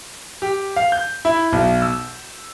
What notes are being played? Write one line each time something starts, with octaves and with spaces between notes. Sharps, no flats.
G4
F5
G6
E4
B1
E6